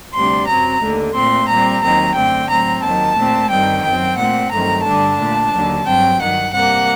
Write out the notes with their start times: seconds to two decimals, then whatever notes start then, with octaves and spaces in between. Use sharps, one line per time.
0.15 D2 C3 G3 D4 C6
0.48 F#2 F#3 C4 A#5
0.82 D#2 D3 A3
1.16 A#2 A3 C4 C6
1.49 A#2 G3 C4 A#5
1.83 D#2 D#3 F#3 C4 A#5
2.16 F#2 D3 A3 C4 G5
2.50 A2 F#3 C4 A#5
2.84 D#2 D#3 F#3 A5
3.17 A#2 A3 C4
3.51 G2 D#3 G3 C4 G5
3.84 F#2 F#3 C4 G5
4.18 A#2 A3 C4 F#5
4.52 G2 D#3 F#3 A3 C4 A#5
4.85 G2 D3 G3 D4 A5
5.18 A#2 A3 D4
5.53 D#2 D3 F#3
5.86 G2 F#3 C4 G5
6.20 G2 D#3 F#3 F#5
6.53 C3 G3 A#3 F#5